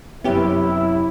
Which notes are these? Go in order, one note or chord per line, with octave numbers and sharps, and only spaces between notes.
F#2 C3 B3 C#4 E4 G4